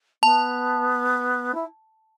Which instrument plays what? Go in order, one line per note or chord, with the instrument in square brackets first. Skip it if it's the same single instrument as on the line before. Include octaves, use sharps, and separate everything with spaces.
[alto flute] B3 [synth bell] A5
[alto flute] E4